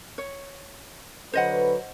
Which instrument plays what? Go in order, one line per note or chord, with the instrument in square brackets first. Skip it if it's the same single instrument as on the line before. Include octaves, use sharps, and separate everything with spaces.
[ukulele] C#5
[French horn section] D3 F#3 B4 [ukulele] C5 D#5 F#5